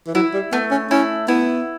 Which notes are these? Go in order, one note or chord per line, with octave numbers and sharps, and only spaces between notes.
E3
F#3 E4
G3
A3 B3
C#4
C#4 E4
B3 E4